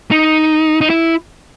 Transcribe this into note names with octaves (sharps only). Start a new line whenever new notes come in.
D#4
D#4
E4